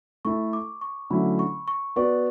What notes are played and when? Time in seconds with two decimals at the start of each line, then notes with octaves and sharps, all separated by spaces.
0.25 A3 E4 A4 C#6
0.53 D6
0.81 C#6
1.10 D3 F#3 A3 C#4 E4 B5
1.39 C#6
1.68 C#6
1.96 B3 F#4 B4 D5 C#6